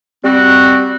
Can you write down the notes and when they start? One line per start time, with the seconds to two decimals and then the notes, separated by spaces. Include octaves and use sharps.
0.24 G3 C4 F#4